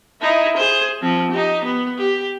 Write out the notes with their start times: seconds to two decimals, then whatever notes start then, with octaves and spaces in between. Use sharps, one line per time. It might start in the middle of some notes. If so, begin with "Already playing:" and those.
0.21 D#4 E4
0.57 G#4 C5
1.02 F3 C4
1.31 D#4 G4
1.64 B3
1.98 G4